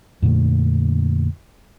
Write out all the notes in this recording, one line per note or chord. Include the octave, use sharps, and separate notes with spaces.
F2 A#2 D3 A3